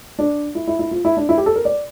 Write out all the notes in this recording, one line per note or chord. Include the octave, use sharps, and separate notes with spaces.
D4
E4
E4
E4
F4
E4
D4
E4
G4
A4
A#4
D5